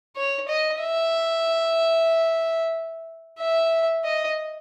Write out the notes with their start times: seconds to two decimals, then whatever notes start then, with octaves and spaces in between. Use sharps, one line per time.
0.16 C#5
0.48 D#5
0.81 E5
3.39 E5
4.04 D#5